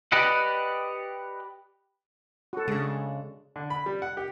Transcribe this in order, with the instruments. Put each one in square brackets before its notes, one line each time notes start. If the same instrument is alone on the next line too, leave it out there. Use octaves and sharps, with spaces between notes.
[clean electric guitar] G4 B4 D5 D#5 F#5
[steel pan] F#4 A4
[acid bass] C#3 [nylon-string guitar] G#3 D4
[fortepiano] D3
B5
G3
F#5
G4